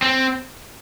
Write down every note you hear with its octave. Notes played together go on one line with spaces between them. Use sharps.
C4